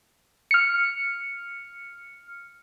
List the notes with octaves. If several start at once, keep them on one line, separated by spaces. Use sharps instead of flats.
F6 C#7